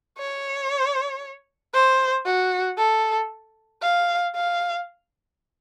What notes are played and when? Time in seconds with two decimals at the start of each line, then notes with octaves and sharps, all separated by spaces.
0.18 C#5
1.74 C5
2.26 F#4
2.78 A4
3.82 F5
4.36 F5